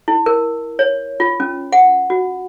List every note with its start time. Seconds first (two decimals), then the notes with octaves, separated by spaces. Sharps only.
0.08 E4
0.26 A#4
0.79 C#5
1.20 F4
1.40 C#4
1.72 F#5
2.10 F#4